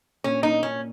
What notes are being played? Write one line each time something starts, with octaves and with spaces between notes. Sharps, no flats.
A#2 C#4
A#3 C#4 D#4
A#2 C#4